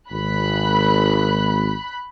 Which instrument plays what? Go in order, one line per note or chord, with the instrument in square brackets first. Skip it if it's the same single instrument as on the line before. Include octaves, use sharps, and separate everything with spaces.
[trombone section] G#1 [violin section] B5 F#6